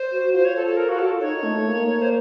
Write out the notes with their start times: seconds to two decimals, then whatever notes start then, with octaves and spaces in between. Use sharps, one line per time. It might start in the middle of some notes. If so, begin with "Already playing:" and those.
Already playing: C5
0.11 F#4
0.34 F4 C5
0.45 C#5
0.56 A4
0.67 A4
0.77 A#4
0.89 F#4
0.99 A4
1.21 D#4 C#5
1.43 A3
1.65 A#3
2.02 C5